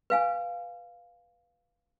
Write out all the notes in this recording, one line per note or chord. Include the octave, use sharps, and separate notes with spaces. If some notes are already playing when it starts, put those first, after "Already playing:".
B4 F5 G#5